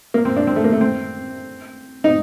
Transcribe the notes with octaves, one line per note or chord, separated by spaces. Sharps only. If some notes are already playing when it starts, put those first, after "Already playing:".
A#3
C4
D4
C4
A3
A#3
A3
C4
D#4